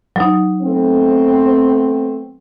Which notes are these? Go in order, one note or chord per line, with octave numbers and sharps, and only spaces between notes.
F#3 D#4
A3 B3 C4